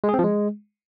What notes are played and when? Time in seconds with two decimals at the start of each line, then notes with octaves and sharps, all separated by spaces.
0.04 G#3
0.09 G#4
0.14 C4
0.19 F3
0.24 G#3